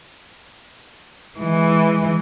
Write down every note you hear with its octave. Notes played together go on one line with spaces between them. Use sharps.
E3 G#3